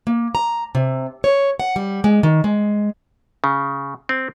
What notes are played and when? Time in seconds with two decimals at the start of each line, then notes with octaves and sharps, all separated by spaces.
0.07 A#3
0.35 A#5
0.75 C3
1.24 C#5
1.60 F#5
1.76 G3
2.04 G#3
2.23 D#3
2.44 G#3
3.44 C#3
4.09 C4